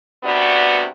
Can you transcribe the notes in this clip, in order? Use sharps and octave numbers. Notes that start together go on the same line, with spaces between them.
D2 G2 C3 B3 F#4 D5